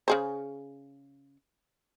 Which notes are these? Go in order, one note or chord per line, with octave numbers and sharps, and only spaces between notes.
C#3 G#4 C5